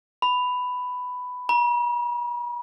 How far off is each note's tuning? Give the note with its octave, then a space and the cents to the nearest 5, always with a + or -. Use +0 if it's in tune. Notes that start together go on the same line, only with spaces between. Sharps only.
B5 +10
B5 -45